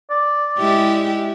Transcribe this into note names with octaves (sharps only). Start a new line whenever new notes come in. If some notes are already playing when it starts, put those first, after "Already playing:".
D5
G#3 E4 G4